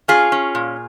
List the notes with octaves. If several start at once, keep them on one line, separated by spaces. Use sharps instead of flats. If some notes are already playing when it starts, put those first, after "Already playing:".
C#4 F4 G#4
C#4
A#2